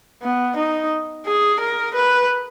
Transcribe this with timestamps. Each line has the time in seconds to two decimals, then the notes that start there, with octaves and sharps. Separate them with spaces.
0.22 B3
0.56 D#4
1.26 G#4
1.60 A#4
1.94 B4